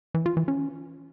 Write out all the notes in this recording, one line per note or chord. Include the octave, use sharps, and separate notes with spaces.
E3
F4
E3
C#4